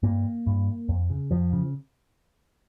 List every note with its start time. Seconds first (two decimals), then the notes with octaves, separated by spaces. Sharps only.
0.03 G2 A#3
0.47 G2
0.89 F2
1.10 C#3
1.31 F2 F3
1.53 C#3